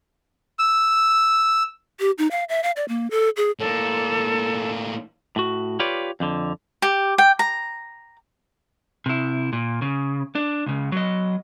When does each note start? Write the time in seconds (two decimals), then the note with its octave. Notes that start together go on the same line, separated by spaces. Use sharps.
0.59 E6
1.99 G4
2.18 D#4
2.31 F5
2.49 E5
2.63 F5
2.76 D5
2.88 A#3
3.11 A4
3.37 G#4
3.59 A2 A#3 A4
5.36 A2 F#4
5.80 F4 G4 B4 C#5 D5
6.20 F2 D3
6.82 G4
7.18 G5
7.39 A#5
9.06 C3 E4
9.53 A#2
9.82 C#3
10.35 D4
10.66 C#2 C#3
10.92 F#3 D#5